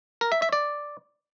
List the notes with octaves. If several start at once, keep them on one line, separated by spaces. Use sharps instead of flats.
A#4
E5
E5
D5